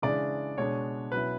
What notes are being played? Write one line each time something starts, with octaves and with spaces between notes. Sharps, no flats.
C#3 E3 G#3 D4 D5
B2 G#3 D4 C#5
B2 F#3 C#4 E4 B4